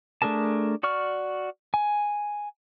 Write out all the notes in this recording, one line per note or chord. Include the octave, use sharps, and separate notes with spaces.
A3 D4 G#4 A#4 A5
F#4 D5 C#6 F6
G#5